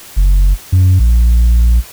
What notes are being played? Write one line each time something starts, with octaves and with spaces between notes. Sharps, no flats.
F#1
F#2
A#1